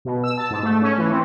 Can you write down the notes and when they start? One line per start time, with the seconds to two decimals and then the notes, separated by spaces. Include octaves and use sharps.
0.05 B2
0.24 E6
0.38 A5
0.51 G#2
0.63 A3
0.82 C#4
0.98 E3
1.11 C4